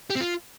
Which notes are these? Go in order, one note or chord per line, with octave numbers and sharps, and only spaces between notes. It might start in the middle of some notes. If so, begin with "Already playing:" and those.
G4
C4
F4